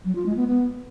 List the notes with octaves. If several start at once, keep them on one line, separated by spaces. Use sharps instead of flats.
F#3
F4
G#3
B3
B3